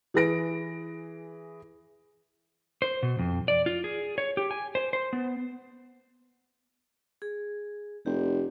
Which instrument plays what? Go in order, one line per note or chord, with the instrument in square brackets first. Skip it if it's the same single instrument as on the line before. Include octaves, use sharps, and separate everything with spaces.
[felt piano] E3 G#4 B4 A#6 D7
[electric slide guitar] C5
B2
F2
D5
F4
G#4
C#5
G4
G#5
C5
C5
B3
[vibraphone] G#4
[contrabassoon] F1 [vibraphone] G4